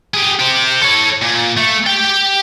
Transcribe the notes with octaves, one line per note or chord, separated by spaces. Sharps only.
G4 G#4
G4 C5
A4 C#5
A#2
A3
G4 G5